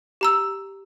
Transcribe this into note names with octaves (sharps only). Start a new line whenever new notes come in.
G4 A#5 E6